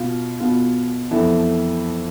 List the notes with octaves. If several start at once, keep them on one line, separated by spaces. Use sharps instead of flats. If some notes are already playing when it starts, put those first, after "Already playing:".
Already playing: B2 B3 F4
B2 B3 F4
F2 E3 B3 E4 A4